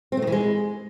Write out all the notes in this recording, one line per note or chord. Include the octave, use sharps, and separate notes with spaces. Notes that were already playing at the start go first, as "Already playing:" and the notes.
C4
A3
D#3
E3
G#3